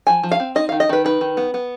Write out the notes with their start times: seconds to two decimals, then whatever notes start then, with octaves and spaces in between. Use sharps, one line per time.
0.07 F3 G#5
0.23 F3
0.32 F5
0.40 C4
0.55 D#4 D#5
0.69 D#3 F5
0.80 D#5
0.89 D#3 B4
1.04 D#4 B4
1.21 D#3
1.37 B3
1.54 B3